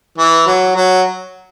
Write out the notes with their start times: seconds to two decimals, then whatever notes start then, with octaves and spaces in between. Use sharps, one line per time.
0.18 E3
0.47 F#3
0.76 F#3